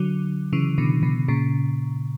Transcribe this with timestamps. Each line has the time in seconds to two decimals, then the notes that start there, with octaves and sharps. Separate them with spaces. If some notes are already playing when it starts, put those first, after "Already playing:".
Already playing: D3 F#3
0.53 C#3 E3
0.78 B2 D3
1.03 B2 D3
1.28 A#2 C#3